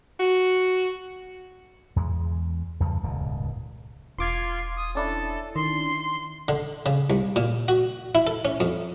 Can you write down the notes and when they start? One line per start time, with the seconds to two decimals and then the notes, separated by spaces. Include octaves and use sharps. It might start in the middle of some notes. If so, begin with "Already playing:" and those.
0.20 F#4
1.96 E2 G#3
2.80 E2 G2 C#3 F3
3.03 D#1 C#2 G#2 B2
4.18 E1 F4 C6 D6 G#6
4.76 D#6
4.95 C#4 D4 E4 A4
5.56 D#3 C6
6.48 D3
6.86 C#3
7.10 C2
7.36 A#2
7.68 F#4
8.15 E4
8.27 A4
8.45 C#4
8.60 F2